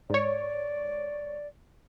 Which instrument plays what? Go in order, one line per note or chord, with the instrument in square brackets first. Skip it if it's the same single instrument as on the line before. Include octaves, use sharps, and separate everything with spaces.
[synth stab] G#2 C#5 [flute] D5